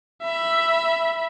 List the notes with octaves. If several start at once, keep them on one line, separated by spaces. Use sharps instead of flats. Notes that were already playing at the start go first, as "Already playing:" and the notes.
E5 B5